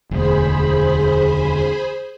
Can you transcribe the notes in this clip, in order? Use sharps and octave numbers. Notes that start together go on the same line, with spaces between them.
E1 D2 G#4 C5 B5